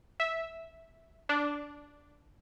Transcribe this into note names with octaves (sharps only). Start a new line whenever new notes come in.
E5
D4